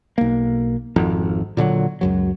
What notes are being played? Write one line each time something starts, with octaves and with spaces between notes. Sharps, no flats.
B1 A#3
G#1 F2
A#2 D3 E3 F#3
C#2 F#2 F#3